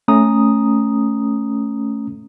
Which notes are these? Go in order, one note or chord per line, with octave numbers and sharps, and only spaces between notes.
A3 C#4 A#5 D#6